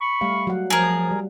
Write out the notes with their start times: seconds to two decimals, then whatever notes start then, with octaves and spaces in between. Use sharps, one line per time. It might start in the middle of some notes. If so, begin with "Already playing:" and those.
0.01 B5 C#6
0.21 G3 A3 F5
0.47 F#3 F#5
0.70 F3 G#4 A#4
1.11 G3